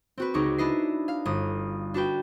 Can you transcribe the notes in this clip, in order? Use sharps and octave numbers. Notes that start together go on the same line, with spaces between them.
C4 F#4 B4
C#2 D#4 C#6 D6
D4 E4 B4 D#5 C7
F5
G1 D#6
D4 F#4 B4 G5